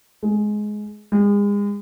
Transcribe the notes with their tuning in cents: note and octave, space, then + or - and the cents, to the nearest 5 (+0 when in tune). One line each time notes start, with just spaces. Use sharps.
G#3 +15
G#3 -35